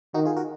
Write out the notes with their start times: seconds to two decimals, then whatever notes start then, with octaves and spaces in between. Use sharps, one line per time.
0.14 D#3 D#4 F#4
0.25 F4 G#4
0.36 F#4 A#4